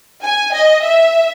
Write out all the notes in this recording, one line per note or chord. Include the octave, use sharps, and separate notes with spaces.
G#5
D#5
E5